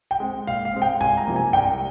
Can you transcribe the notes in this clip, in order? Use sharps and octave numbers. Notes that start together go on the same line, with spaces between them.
G5
G#3 C4
A#2 F5
F5
G#3 C4
G5
C2 G#5
A#5
C3 F3 A#3
G#5
C2 G5